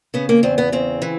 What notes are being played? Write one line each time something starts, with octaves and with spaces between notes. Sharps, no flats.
C#3 B3
A#3
E2 C4
B3
C#3 C4
E3